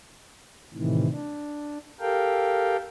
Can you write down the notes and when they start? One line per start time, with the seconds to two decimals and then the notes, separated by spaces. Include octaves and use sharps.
0.74 A2 C3 D#3 E3
1.11 D4
2.00 G4 A4 A#4 F5 G5